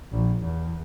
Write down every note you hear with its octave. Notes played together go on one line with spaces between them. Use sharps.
A#1
E2